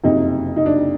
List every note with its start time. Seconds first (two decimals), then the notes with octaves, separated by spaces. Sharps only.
0.04 F#1 F2 C3 D#4
0.56 D#4
0.66 D4